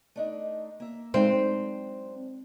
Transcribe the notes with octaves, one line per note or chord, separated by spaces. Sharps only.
A3 D4 D#4
A#3 E5
F#2 G#3 C4 D4 D#4 G5